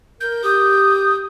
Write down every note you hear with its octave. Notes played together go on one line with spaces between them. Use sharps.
A#4 G6
G4 D#6